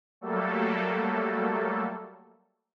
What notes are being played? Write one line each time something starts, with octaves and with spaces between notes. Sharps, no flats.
F#3 G3 A3 A#3 A4